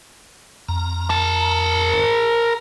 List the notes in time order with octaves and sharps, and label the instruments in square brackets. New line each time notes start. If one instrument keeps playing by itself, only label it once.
[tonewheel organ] F2 A#5
[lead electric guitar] A#4 A5